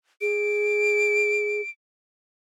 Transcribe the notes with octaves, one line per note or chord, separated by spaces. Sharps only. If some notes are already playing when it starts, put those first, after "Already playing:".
G#4 D7